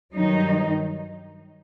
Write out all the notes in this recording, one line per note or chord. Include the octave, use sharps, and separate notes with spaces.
G2 D#3 F#3 D#4